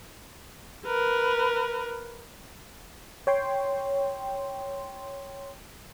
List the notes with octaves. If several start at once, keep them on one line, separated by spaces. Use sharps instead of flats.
A#4 B4
C#5 G5 C6